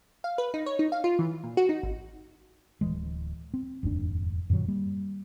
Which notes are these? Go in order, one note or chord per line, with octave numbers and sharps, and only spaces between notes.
F5
B4
D#4
C#5
D#4
F5
F4
E3
A#2
F#4
D#4
G#1
D1 E3 G#3
C4
F1 D#2 G#2 D4
F#2 A#2 D#3 F#3
G3 A#3